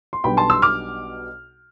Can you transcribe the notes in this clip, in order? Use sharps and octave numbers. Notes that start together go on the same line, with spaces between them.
C6
B1 B2 G3 B3 D4 G5 B5
A5 C6
C6 E6
D6 F6